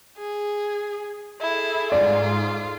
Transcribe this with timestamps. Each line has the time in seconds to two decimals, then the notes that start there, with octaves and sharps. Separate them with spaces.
0.18 G#4
1.41 E4 G#4 A4
1.92 G#2 F4 D5